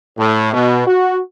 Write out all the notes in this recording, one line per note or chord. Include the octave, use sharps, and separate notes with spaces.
A2
B2
F#4